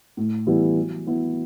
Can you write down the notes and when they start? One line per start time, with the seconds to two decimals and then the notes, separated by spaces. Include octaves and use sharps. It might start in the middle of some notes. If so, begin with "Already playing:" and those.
0.17 A2
0.47 E3 G3 B3 E4
0.77 F#3
1.07 B3 E4